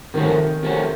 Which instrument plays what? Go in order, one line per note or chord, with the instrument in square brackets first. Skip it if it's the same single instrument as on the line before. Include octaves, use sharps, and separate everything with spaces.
[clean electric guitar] C3 F3 A3 C#4 F#4 [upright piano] D#3
[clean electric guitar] C3 F3 A3 C#4 F#4